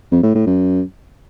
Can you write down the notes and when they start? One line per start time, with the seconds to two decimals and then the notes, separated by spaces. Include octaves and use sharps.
0.12 F2
0.23 A2
0.35 A2
0.47 F#2